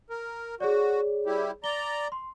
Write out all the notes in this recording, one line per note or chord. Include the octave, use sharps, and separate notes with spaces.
A#4
F#4 G#4 C#5 D5
G3 E4 G4
D5 A#5 G7
C6